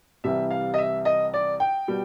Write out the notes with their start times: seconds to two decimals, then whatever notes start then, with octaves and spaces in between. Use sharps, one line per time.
0.24 C2 C3 E3 G3 E5
0.50 F5
0.74 D#5
0.78 E5
1.05 D#5
1.34 D5
1.60 G5
1.88 B2 G3